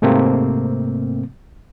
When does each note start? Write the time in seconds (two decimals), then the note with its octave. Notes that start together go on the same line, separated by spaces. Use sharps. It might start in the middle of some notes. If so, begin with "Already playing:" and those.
0.02 G#2 C3 A3 A#3 C4